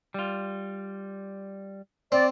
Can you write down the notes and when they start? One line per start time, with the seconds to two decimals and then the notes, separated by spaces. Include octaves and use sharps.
0.14 G3 F4
2.12 C4 D5